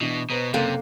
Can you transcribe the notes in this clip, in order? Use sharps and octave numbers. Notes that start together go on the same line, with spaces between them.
B2 E3 D4 G7
B2 B4 C5 A#5
F#1 C3 A#3 A4 F#6 F7